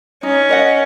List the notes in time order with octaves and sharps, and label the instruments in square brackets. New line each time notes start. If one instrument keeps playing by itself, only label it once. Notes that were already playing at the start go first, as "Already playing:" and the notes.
[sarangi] C#4 [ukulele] D#4
[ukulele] A#4 D#5 F#5